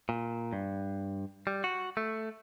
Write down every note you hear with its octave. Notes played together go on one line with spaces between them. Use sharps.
A#2
G2
G3
F#4
A3